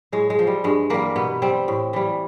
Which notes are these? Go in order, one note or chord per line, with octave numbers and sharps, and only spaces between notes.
A2 G#3
G#3
F3
G3
G2 G#3
E3 G3 A#3
B2 B3
G3 C4
A2
E3 G3